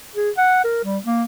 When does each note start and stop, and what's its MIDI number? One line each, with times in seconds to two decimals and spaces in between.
0.15 0.30 68
0.37 0.63 78
0.64 0.80 70
0.85 0.98 55
1.05 1.24 58